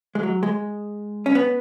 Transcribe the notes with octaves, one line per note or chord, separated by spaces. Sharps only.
G#3
F#3
G#3
C#4
B3